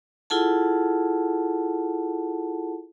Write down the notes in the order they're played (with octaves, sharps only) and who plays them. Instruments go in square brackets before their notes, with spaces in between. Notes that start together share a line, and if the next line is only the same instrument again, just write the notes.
[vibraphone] E4 F4 G#4 A4 F#5 A5